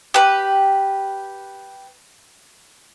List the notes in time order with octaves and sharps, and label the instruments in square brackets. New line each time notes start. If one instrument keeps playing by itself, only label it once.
[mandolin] G4 B4